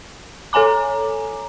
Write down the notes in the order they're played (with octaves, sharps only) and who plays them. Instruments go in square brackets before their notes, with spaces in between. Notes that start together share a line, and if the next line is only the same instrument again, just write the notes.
[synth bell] A4 C#5 G#5 A#5 D6